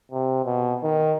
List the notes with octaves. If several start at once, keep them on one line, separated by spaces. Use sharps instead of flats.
C3
B2
D#3